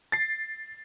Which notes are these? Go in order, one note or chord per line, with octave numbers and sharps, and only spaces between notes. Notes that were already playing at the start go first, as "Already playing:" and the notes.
A6 C7